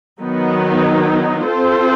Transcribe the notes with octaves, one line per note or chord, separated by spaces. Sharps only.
D#3 F#3 B3 D#4
C4 F4 A4 C5